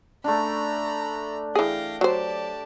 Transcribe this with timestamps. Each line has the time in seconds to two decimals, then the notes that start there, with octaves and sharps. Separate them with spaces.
0.24 A3 D4 A#5 B5
1.55 E3 G#4 F5 G5 A#6
2.01 F#3 G4 C5 D5 A5